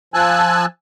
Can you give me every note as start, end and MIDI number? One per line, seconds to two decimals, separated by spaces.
0.14 0.65 53
0.14 0.65 80
0.14 0.65 81
0.14 0.65 88
0.14 0.65 90